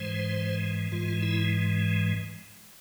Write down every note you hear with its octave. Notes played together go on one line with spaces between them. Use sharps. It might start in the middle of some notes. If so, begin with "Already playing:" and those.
Already playing: G#2 E3 G#3 C5
G#2 E3 G#3 F4
E4